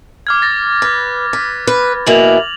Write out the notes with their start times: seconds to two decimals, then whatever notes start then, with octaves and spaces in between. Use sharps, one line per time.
0.27 D6 F6 G#6
0.42 A6 A#6
0.82 B4
1.33 B4
1.67 B4
2.07 B2 E3 A#3 F7 F#7